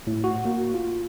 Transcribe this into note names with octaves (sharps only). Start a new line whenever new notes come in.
A2
F#4
A#3
F4